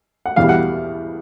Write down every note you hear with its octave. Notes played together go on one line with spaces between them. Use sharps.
F#5
E2 B2 G3 F5
F#5